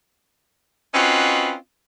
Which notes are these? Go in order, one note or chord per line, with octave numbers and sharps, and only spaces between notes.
C4 C#4 D#4 F4 F#4 B4